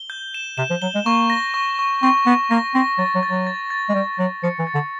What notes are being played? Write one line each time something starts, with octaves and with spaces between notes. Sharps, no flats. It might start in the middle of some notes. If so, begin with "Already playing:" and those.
Already playing: G7
G6
E7
C3 E7
F3
F#3 G7
G#3
A#3 C#6
A#6
C#6
C#6
C4 C#6
B3 C#6
A#3 A#6
C4 A#6
F#3 A6
F#3
A6
F#3
A6
A6
G#3
G3 A6
F#3 A6
F3 C#7
E3
A6
D3